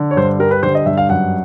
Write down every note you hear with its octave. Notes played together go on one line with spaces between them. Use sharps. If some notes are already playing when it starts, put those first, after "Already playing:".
Already playing: D3
C#5
G2 C5
G3 A#4
B4
D3 C5
D#5
G2 E5
F5
F#2 F#5